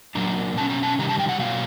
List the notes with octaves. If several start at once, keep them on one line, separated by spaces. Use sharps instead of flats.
A#2 F#3 A#3 D4 A#5
B2 G#3 C#4 A5
A#5
A5
C3 D#3 G3 A#5
A5
G5
F#5
B2 F#3 A#3 F5